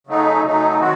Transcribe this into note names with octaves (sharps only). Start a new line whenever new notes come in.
C#3 F#3 A3 D#4
C#3 F#3 A3 D#4
D#3 F#3 C4 F#4